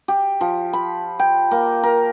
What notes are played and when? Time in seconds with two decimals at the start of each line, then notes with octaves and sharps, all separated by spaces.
0.08 G4
0.41 F3
0.73 B5
1.19 G5
1.51 A#3
1.83 A#4